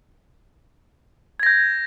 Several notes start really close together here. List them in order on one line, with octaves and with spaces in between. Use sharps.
G#6 A#6 G6